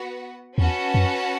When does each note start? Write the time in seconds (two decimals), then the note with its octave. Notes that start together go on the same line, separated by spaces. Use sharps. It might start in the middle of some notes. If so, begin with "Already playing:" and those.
Already playing: B3 F#4 B4 F#5
0.58 E2 C#4 F#4 B4 F#5 A5
0.94 F#2